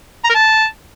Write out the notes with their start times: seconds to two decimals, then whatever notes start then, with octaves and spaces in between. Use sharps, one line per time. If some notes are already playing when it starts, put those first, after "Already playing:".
0.25 A#5
0.30 A#4
0.35 A5